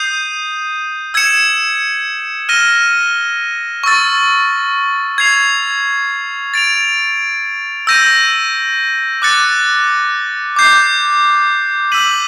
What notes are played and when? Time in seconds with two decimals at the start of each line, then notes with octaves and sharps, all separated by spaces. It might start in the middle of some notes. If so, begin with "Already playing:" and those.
Already playing: D#6 G6 C7 D#7
1.14 E6 G#6 C#7 E7
2.49 F6 A#6 D#7 G7
3.84 C#6 E6 A6
5.18 G#6 C7 F7
6.54 A6 D7 F7
7.87 E6 G6 A#6 D#7
9.22 D6 F#6 A6 C#7
10.56 D6 G6 C7
11.92 E6 G6 B6 D#7 F#7